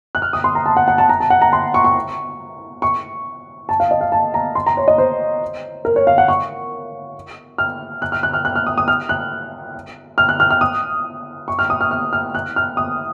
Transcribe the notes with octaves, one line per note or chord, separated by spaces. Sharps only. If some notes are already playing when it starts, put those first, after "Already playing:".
F#6
F6
D#6
C6
A#5
A5
F#5
F#5
A5
A#5
A5
F#5
A#5
C6
C#6
C#6
C#6
A5
F5
D#5
F5
A5
A#5
C6
A#5
C#5
D#5
C5
A#4
C#5
F5
F#5
C#6
F6
F#6
F6
F#6
F6
F#6
F6
D#6
D#6
F6
F#6
F6
F#6
F6
F6
D#6
C#6
F6
D#6
F6
F6
F6
F#6
F6
D#6